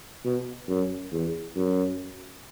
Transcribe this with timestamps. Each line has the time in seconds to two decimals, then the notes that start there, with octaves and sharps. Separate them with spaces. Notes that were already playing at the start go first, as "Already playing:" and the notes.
0.25 B2
0.68 F#2
1.12 E2
1.56 F#2